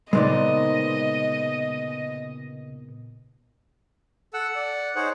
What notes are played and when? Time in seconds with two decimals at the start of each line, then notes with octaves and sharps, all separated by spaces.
0.13 A#2 C#3 G#3 B3 C4 D#4 D5 D#5
4.34 A4 F#5 E6
4.56 D5
4.96 D#4 G#4 C5 C#5 F#5